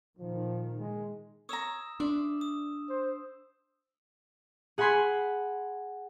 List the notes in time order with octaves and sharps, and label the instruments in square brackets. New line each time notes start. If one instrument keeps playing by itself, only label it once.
[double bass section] A#2 D#3 [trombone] F3
[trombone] G#3
[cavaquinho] C#5 A#5 [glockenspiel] D#6 E6 E7
[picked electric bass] D4 [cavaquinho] D5 E5 C6
[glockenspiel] D#6
[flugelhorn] C5
[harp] G#4 F#5 G#5 B5 C6 G#6